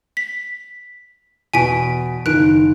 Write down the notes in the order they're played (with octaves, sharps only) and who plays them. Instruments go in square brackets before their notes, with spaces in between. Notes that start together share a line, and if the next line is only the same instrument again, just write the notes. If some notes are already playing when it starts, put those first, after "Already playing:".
[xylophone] B6
[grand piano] E2 B2 [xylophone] G#5 B6 D7
[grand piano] F#1 D#3 [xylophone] F#6 D7